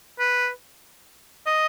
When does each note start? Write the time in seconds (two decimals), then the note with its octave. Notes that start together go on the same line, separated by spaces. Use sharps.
0.20 B4
1.46 D#5